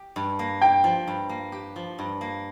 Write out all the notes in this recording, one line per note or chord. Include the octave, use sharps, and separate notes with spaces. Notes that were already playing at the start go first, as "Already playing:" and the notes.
Already playing: G4
G2
A#3
G4 G5
F3
G2
A#3
G4
F3
G2
A#3